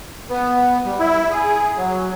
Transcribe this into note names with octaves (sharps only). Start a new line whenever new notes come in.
B3
G3
E4
G#4
F#3